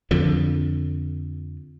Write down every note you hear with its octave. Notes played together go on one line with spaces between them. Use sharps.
F2 D3 F3